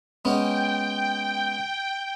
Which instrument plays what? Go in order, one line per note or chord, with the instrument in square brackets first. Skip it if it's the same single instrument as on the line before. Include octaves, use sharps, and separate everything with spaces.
[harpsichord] G#3 B3 C#4 [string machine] G5